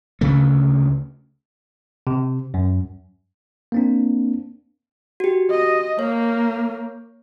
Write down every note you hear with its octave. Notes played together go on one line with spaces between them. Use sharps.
D2 C#3 A3
C3
F#2
A#3 C4 D4
F#4 G4
D#5
A#3 C#5